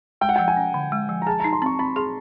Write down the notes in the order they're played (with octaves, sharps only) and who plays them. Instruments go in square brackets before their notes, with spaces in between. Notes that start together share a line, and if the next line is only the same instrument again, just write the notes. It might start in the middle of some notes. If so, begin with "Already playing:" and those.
[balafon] G#3 [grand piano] G5
[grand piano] F#5
[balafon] F3 [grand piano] G5
[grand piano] G#5
[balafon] C#4
D3
G#3
F3
[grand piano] A#5
[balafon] G#4 [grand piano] A5
[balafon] D#4 [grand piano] A#5
[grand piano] C6
[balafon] C4 [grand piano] C#6
[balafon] C4 [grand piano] B5
[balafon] G#4 [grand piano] C6